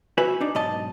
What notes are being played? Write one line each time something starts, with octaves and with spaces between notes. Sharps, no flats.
F#4 B4 E5 G#5
D4 D#4
B1 G#2 D#5 A5